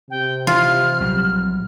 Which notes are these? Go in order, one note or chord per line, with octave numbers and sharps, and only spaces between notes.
C3 G5
E3 F4 F6
A#1 F#3 G3